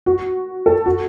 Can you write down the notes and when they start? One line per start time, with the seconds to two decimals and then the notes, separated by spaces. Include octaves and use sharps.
0.06 F#4
0.66 A4
0.86 F#4